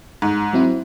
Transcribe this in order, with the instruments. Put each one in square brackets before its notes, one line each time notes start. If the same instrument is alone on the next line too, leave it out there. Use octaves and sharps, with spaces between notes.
[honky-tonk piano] G#2
[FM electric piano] F#3 C4 E4